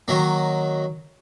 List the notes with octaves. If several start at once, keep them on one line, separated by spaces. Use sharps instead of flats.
D#3 F#3 A#3